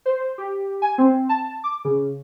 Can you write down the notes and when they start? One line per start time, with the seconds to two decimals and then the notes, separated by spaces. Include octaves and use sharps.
0.06 C5
0.38 G4
0.82 G#5
0.98 C4
1.29 A5
1.64 D6
1.85 C#3